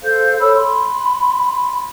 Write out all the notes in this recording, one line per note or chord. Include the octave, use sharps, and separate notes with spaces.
A4 C5 F5 G6
A4 C#5 B5 E6
B5 C6